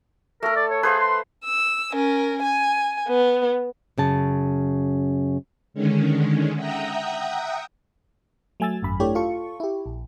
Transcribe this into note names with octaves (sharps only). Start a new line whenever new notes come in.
A3 A4 A#4
D5
C#5
G#4 B4 C5 F5
C6
E6
C#4 A#4
G#5
B3
F#2 C#3 A5
D3 D#3 G#3 C#4
E5 F#5 G5 A#5 D#6 E6
F#3 A3 G#5 E6 A6
G#1 F#2 B5
A3 D4 E4 G4 C#5
F4 A4 C#6
E4 G4
A#1